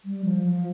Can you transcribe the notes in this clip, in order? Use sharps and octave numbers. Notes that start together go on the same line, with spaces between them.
G3
F3
F3